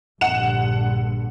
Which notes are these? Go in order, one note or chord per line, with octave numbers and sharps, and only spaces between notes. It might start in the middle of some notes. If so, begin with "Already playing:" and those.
A#1 G2 D3 F#5 E7